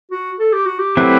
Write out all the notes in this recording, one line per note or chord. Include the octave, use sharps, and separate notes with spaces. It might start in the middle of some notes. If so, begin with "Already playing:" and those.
F#4
A4
G4
F#4
G4
F#3 A3 C4 E4 B4